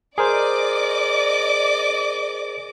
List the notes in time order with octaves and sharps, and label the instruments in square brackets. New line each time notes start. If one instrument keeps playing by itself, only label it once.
[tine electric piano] G#4 A#4 C5 [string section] D5 D#5 D6